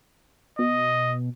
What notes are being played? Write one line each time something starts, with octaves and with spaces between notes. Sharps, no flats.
B2 D#5